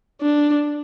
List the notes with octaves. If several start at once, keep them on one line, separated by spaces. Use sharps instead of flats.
D4